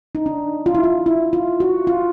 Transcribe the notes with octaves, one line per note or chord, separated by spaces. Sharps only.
D#4
D4
F4
E4
F4
E4
F4
F#4
F4